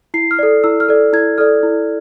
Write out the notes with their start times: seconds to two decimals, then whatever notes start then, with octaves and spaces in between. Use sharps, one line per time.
0.14 E4 C7
0.31 F6
0.39 A4 D5
0.64 E4 E6
0.80 F6
0.89 A4 D5
1.13 E4 G#6
1.38 A4 D5 F6
1.63 E4